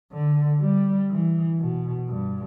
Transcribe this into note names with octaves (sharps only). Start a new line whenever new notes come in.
D3
G3
E3
B2
G2